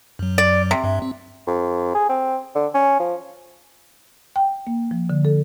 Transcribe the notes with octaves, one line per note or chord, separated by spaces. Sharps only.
F#2 F#3
D5
C3
G2 E5
C4
F2
G#4
C4
D3
C#4
F3
G5
A#3
F3
D3
A4